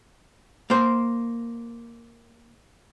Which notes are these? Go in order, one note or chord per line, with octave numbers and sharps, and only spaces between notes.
A#3 C5